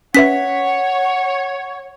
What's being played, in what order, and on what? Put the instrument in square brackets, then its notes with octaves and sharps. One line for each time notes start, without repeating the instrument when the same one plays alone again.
[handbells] C#4 B4 E5 [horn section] C#5 [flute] F#5 [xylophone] B6